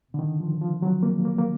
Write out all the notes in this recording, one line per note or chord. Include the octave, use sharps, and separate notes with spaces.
D3
D#3
F3
F3
F#3
A#3
A#3
A#3